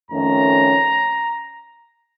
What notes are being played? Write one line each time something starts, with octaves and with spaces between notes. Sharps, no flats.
F2 D#3 A3 C#4 A#5